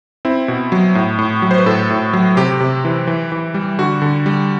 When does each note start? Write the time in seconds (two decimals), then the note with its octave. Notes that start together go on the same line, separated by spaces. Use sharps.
0.25 C4 E4
0.48 B2
0.72 F#3
0.95 A2
1.19 A2
1.42 F#3
1.51 C5
1.58 B4
1.66 A2 A4
1.90 A2
2.13 F#3
2.37 C3 G4
2.60 C3
2.85 E3
3.07 E3
3.32 E3
3.54 G3
3.78 D3 F#4
4.02 D3
4.26 G3